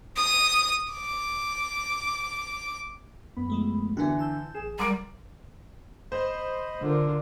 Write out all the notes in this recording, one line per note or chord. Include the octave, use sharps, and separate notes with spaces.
D#6
D6
F#2 B3 B5
F3 G#3 A3
D3 E3 B3 E4 F#4 F#6
A5 E6 G6
A1 G#4 E7
G3 A#4 F#5 C6 D6 D7
C5 D#5 B5
D3 F4 A#4